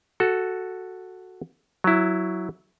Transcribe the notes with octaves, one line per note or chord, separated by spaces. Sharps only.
F#4 A4
F#3 E4